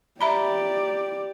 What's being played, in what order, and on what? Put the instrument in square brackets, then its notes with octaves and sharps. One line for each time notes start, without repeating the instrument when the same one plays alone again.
[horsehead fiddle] G4 D5 [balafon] E5 A#5 B5